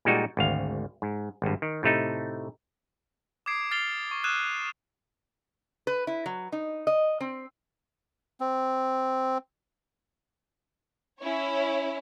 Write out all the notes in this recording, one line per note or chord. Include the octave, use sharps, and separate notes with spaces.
A#2 G3 G#3 D#4 F#4
G#1 D2 F5
G#2
G#1 G2
D#3
A2 C3 A3 D#4
D6 D#6 G#6 C7 D7
F6 A6 C7 F7 G7
C#6
D#6 F6 F#6 G#6 D#7 E7
B4
E4
F#3
D#4
D#5
C4
C4
C#4 E4 C#5